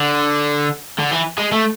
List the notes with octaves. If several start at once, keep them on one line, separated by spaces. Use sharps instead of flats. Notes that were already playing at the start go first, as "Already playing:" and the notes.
Already playing: D3
D3
E3
G#3
A3